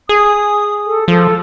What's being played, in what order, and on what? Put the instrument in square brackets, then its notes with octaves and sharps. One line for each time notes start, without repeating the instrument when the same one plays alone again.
[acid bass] G#4 [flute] D#6
[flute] A4
[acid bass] F3 [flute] A4